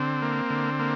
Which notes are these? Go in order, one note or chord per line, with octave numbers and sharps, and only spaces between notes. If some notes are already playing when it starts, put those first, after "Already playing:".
Already playing: D3 C4
A#3
D3
A#3